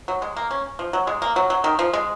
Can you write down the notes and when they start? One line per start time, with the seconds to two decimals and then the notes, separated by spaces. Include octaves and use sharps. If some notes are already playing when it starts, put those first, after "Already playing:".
0.08 F#3
0.22 G#3
0.36 A#3
0.51 C#4
0.79 F3
0.93 F#3
1.07 G#3
1.22 A#3
1.36 F#3
1.50 F#3
1.64 D#3
1.79 F3
1.93 G#3